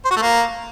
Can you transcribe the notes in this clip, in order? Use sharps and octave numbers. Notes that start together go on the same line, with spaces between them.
C5
F#4
A3
A#3